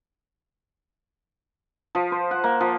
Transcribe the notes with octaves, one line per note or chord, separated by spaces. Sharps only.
F3
C5
F#5
A#3
F3